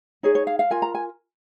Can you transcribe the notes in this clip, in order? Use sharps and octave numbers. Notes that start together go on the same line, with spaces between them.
D#4 G#4 C#5
C#5
F5
F5
F4 A#4 G#5
A#5
G#5